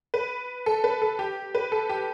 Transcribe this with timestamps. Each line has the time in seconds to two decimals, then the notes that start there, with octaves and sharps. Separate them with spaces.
0.14 B4
0.66 A4
0.84 B4
1.02 A4
1.19 G4
1.55 B4
1.72 A4
1.89 G4